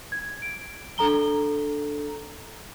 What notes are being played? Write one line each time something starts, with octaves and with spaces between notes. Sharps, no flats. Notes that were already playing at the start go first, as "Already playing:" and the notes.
G#6
D7
D4 A4 A#5 G7